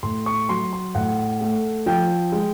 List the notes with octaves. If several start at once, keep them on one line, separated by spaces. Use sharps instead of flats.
A2 C6
C#6
F#3 C6
C6
A2 F#5
A3
F3 G5
G#3